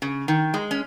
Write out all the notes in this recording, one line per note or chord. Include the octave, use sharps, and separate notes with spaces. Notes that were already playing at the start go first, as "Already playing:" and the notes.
C#3
D#3
G#3
C#4